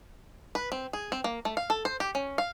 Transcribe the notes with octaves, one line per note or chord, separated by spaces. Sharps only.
B4
C4
G#4
C4
A#3
A3
F5
A4
C5
G4
C#4
F5